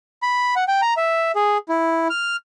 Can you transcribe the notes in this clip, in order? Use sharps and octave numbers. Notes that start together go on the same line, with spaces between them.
B5
F#5
G5
A#5
E5
G#4
E4
F6